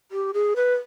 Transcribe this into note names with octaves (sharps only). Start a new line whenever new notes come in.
G4
G#4
B4